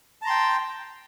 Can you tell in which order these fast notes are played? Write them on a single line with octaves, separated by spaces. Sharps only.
A5 A#5 C6 G5